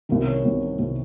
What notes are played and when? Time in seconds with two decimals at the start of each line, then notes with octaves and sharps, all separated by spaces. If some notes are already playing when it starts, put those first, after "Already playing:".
0.09 C2 C3 D#3 A#4
0.26 C#5
0.45 C2 C3 D#3
0.79 C2 C3 D#3